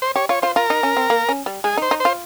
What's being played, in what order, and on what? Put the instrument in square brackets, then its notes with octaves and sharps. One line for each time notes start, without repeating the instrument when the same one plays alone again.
[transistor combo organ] C5
[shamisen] G4 [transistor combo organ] C#5
[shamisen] F4 [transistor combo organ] C#5
[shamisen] F4 [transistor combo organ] C5
[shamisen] F4 [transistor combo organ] A#4
[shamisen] D#4
C#4
C4
A#3
C#4
G3
[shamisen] G#3 [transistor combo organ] G#4
[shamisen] D#4
[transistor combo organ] C5
[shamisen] D#4
[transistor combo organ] C5
[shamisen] F4